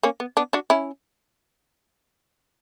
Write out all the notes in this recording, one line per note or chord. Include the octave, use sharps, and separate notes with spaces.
A#3 C#4
B3
B3 D4
D4 F#4
C#4 E4